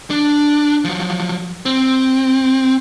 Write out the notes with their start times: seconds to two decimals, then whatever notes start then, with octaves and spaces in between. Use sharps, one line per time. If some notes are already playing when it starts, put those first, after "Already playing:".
0.10 D4
0.84 F3 F#3
1.65 C4